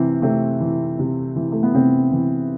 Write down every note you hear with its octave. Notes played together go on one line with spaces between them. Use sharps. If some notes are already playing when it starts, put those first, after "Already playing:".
Already playing: C3 E3 C4
C3 A3 C4
E3
C3
E3
A3
B3
C3 A3 C4
E3